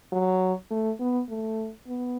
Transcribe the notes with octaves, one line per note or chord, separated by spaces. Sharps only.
F#3
A3
B3
A3
B3